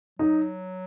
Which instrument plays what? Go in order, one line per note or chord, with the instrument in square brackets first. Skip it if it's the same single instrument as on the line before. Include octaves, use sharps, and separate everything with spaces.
[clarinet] F#3 [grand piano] D#4